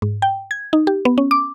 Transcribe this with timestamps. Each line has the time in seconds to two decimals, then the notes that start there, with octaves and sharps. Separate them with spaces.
0.02 G#2
0.22 G5
0.51 G#6
0.73 D#4
0.87 G4
1.05 B3
1.18 C#4
1.31 D6